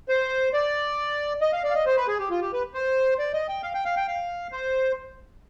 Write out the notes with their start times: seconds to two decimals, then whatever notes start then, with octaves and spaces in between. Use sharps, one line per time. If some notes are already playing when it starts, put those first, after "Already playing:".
0.09 C5
0.53 D5
1.41 D#5
1.52 F5
1.64 D5
1.70 F5
1.75 D#5
1.86 C5
1.97 B4
2.08 G#4
2.19 G4
2.30 F4
2.42 G4
2.53 B4
2.74 C5
3.19 D5
3.34 D#5
3.48 G5
3.63 F5
3.74 G5
3.85 F5
3.97 G5
4.08 F5
4.52 C5